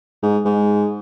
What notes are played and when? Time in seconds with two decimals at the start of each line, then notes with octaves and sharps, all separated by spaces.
0.23 G#2
0.45 G#2